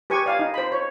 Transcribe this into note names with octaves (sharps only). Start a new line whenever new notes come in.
G4 B4 G#5 C#6
D5 F5 G#5
D#4
C5 B5
C#5